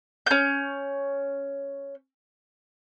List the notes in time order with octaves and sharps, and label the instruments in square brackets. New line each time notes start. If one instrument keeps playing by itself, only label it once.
[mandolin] C#4 G6